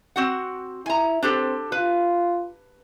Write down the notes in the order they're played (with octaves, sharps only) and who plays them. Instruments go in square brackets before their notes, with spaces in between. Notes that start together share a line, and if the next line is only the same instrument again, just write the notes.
[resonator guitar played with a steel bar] C4 F#4 F#5
[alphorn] E4 [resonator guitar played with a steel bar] G#5 A#5
[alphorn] C4 [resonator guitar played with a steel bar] D4 G4 A4
[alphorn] F4 [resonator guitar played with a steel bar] B4